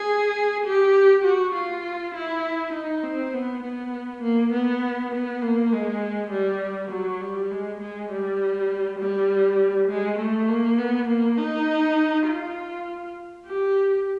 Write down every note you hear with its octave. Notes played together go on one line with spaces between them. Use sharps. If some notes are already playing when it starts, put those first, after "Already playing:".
Already playing: G#4
G4
F#4
F4
E4
D#4
C4
B3
B3
A#3
B3
B3
A#3
G#3
G3
F#3
G3
G#3
G#3
G3
G3
G#3
A3
A#3
B3
A#3
D#4
F4
G4